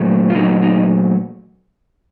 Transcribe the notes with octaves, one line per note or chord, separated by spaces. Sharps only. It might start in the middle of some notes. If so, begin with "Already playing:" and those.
Already playing: A#2 F#3 A3
F4
A#2 F#3 A3 D#4
D#4